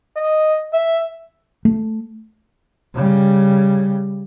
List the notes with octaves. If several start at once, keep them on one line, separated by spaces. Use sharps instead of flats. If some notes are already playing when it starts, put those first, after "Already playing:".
D#5
E5
A3
C#3 G3